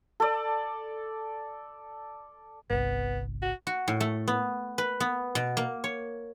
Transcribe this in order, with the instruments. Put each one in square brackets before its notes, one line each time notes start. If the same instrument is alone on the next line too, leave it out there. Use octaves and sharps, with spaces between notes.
[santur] A4 D5
[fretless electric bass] G1 C2 [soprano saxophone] B3
[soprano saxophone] F#4
[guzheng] F#4
A2
A3
B3
B4
B3
B2
A#3
C#5